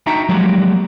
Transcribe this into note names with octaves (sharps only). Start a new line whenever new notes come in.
D4 D#4 F#4 E5 G5 A#5
F3 F#3 G#3 A#3 F#4 G4